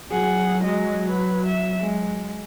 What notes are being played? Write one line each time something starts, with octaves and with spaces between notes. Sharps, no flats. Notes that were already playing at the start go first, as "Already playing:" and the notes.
F#3 G#4 F#5
G#3 D#5
B4
E5
G#3